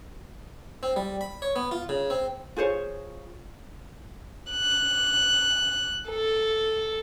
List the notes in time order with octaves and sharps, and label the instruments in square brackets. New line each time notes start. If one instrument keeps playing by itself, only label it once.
[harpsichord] C4
G3
B5
C#5
B3
F4
C#3
C4
[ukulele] F4 G#4 C5 C#5
[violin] F#6
A4